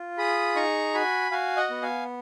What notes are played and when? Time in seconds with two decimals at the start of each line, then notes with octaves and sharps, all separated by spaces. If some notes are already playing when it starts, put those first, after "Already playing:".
Already playing: F4
0.18 G#4 B5 D#6
0.56 D#4 A#5 C#6
0.94 F#4 G#5 B5
1.31 F#4 F5 G#5
1.57 D#5 F#5
1.70 B3
1.82 F5 G#5